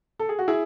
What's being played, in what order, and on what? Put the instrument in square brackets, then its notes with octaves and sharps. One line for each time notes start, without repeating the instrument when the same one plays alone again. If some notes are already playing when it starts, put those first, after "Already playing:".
[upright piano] A4
G#4
F#4
E4 G#4